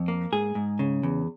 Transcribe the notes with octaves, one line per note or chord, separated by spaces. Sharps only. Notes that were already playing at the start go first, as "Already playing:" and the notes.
Already playing: F2
A#3
G#2 G#4
G#2
C#3
E2